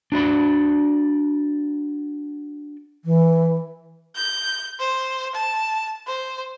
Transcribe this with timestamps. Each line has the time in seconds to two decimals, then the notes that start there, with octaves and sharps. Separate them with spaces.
0.12 D4 F#4 D5 B5
3.05 E3
4.15 G6
4.80 C5
5.35 A5
6.07 C5